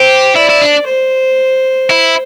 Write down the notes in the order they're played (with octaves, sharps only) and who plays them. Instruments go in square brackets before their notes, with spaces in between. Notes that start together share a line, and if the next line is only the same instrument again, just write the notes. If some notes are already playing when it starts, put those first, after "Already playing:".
Already playing: [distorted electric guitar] G4 [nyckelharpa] C5
[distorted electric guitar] E4 [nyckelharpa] D5
[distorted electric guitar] E4
D4
[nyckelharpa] C5
[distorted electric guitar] E4